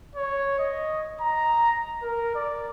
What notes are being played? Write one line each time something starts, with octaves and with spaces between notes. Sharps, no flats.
C#5
D#5
A#5
A#4
D5